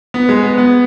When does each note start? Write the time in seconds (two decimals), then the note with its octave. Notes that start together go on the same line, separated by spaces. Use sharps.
0.14 B3
0.29 G#3
0.43 B3
0.58 B3